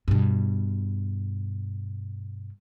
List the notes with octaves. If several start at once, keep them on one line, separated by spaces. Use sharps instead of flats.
G2 B2